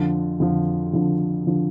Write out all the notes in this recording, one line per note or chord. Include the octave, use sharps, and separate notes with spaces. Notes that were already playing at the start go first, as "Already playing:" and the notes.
Already playing: F2 D3 F3
F2 D3 F3
F2 D3 F3
D3 F3